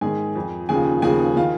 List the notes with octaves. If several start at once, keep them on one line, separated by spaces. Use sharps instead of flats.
G#2 D#3 G#4 G#5
F2 F3
D#2 C#3 F3 G#4 G#5
D#2 C#3 F3 G#4 G#5
D#3 F4 F5